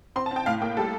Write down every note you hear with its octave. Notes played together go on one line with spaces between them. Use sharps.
C4 C6
A5
C4
G5
A2 F5
A#3 G5
G3 A4